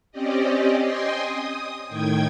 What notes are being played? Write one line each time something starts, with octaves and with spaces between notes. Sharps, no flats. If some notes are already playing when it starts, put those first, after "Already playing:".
C4 C#4 G4 D5 D#5
D#5 G5 G#5 C6
D#6
A2 D#3 G5 G#6